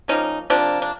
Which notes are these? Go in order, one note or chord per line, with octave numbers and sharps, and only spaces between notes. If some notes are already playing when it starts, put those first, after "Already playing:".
D3 F3 A#3 C#4 D#4
C3 F3 A#3 C4 D4
D4